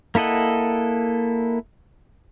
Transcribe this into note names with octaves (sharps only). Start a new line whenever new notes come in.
A#3 E4 A4 D#5 F#5